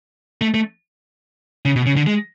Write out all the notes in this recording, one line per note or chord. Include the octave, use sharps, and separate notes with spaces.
A3
A3
C#3
B2
C#3
D3
G#3